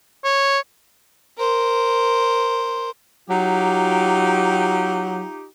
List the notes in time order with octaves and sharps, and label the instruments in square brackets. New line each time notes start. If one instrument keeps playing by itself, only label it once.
[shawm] C#5
[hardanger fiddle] A#4 C5
[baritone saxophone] F#3 [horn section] D#4 F4 G4